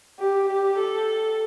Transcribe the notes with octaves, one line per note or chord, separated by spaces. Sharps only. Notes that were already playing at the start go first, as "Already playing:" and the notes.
G4
G4
A4